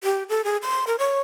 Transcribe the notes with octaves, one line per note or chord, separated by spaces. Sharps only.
G4
A4
G#4
C6
A#4
C#5